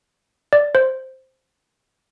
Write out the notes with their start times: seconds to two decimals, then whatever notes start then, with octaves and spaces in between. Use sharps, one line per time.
0.53 D5
0.75 C5